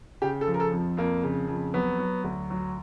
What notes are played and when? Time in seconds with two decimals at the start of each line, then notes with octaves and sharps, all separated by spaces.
0.22 C#3 G4
0.41 A4
0.47 F3
0.54 A#4
0.60 A4
0.72 F2
0.97 F2 A#3
1.23 C#3
1.48 F2
1.74 F#3 B3
1.99 F#3
2.24 D2
2.50 F#3